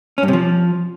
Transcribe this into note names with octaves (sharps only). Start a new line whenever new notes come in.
C#4
G2
C3
F3